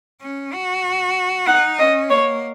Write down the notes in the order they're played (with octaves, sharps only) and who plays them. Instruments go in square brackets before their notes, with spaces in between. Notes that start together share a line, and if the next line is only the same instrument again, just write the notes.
[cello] C#4
F#4
[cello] D#4 [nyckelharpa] F#5
[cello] C#4 [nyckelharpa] D#5
[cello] A#3 [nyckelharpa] C#5